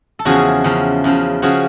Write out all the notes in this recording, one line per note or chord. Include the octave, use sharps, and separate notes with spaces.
A4
E2 C#3 F3 F#4 G#4
E2 C#3 F3
E2 C#3 F3
C#3 F3 F#4 G#4